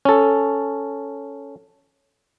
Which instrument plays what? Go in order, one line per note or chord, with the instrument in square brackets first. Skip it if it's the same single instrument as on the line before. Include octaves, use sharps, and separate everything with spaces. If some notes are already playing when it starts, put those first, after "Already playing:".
[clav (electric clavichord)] C#4 A4